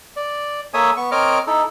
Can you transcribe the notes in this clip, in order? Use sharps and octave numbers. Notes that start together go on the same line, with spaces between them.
D5
A#3 A4 C#5 E5 G#5 D#6
B3 C#6
C4 A#4 C#5 D#5 D6 F6
D#4 E4 A4